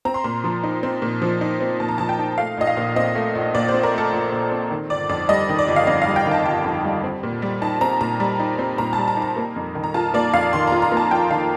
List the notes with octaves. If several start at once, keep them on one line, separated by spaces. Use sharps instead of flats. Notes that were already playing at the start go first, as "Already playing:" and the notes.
C4 A#5
C6
A#2 A#5
F3
D#4
C4
A#2
F3
D#4
C4
A#2 A5
A#5
F3 A5
G5
D#4
A3 F5
A#1 D#5
F5
A#2
C4 D#5
A3
A#1
A#2 D5
C5
C4
A#4
A3 A4
A#1
A#2
C4
D#3
G1 D5
F2 D5
G3 D#5
D#3
D5
G1
F5
F2 D#5
F5
G3
G5
D#3
A5
G1 G5
F2
G3
C4
A#2
G3
D#4 A5
C4 A#5
A#2 A#5
G3
D#4
C4
A#2 A#5
A5
G3
A#5
D#4
A#5
A#3
F2
D#3
A#5
F4 A5
A#3 D5
F2 F5
D#3 C6
A#5
F4
A#5
A#3
A5
F2 G5
D#3 F5